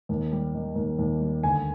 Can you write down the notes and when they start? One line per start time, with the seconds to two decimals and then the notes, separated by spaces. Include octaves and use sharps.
0.09 D#2
0.32 G3
0.54 D#3
0.76 D#2
0.99 D#2
1.21 G3
1.43 D2 G#5